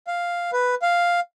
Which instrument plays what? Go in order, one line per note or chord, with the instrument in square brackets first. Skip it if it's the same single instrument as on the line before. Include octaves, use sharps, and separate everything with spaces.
[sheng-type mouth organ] F5
B4
F5